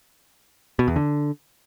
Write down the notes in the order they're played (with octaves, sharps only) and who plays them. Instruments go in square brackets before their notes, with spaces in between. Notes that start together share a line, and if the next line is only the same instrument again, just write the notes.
[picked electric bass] B2
E2
D3